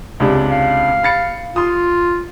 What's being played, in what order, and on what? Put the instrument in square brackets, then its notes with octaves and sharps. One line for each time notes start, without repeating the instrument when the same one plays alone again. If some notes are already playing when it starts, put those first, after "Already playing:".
[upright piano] C#2 C3 D4
[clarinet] F5
[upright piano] B5 A6 C#7
[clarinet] F4 [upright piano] C6 D#6